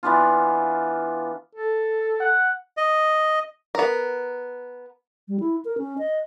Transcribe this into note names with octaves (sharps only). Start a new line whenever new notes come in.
E3 B3 D4 F4
A4
F#5
D#5
B3 A#4
G3
E4
A#4
C#4
D#5